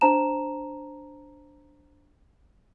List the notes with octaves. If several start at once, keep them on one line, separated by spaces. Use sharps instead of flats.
D4 C5 A5 A#5 E7